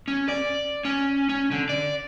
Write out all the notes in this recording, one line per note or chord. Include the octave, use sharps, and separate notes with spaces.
C#4
D5
C#4
C#4
D3
D5